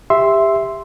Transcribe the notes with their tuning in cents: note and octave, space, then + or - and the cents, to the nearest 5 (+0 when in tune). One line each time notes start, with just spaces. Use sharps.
G4 +25 E5 +0 C6 +0